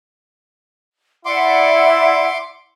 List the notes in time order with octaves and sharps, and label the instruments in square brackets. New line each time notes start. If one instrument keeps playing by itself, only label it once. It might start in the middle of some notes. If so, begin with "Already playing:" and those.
[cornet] E4 [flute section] D5 E5 F#5 [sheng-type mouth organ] C6 D6